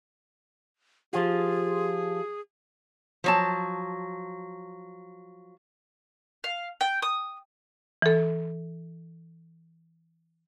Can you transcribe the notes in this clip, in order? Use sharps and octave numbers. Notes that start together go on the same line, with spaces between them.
F3 F4 G4 G#4
F3 F#3 A5
F5
G5
D#6
E3 A4